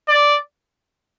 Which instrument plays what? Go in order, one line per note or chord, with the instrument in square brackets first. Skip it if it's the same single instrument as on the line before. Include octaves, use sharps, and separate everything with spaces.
[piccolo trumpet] D5